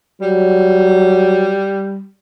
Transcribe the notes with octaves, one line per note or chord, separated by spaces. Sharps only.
F#3 G3